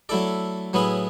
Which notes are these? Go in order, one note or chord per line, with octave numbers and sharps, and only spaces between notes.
F#3 A3 E4 A4 D5
A2 F#3 B3 E4 G#4